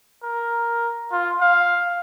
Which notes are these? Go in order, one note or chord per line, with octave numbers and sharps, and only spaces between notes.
A#4
F4
F5